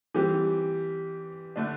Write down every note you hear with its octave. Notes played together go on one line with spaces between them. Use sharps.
E3 G3 C4 G4
D3 A3 D4